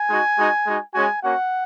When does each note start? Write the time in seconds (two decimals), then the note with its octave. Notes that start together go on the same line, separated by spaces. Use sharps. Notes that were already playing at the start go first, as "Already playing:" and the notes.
Already playing: G#5
0.09 G#3 D#4 F#4
0.37 G#3 D#4 F#4
0.65 G#3 D#4 F#4
0.94 G#3 C#4 F#4 G#5
1.23 A#3 C#4 F#4 F#5